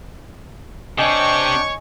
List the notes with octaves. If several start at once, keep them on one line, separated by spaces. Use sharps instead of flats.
C3 C4 D4 C#5 D#5 G5 G#5 C#6